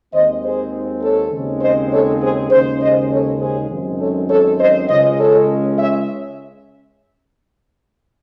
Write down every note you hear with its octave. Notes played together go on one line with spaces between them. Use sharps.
D#2 D#3 G#3 C4 C5 D#5
G#4 C5
A4 C#5
D#2 C#3 G#3 C4
C5 D#5
A4 C#5
G#4 C5
D#2 C#3 G#3 C#4 G#4 C5
C5 D#5
A4 C#5
G#4 C5
F#2 D#3 G#3 C4
A4 C#5
A4 C#5
C5 D#5
C#2 C#3 G#3 C#4 C5 D#5
A4 C#5
C#5 E5